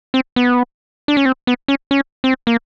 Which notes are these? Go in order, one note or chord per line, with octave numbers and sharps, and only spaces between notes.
C4
B3
D4
C#4
C4
B3
C#4
C#4
C4
A#3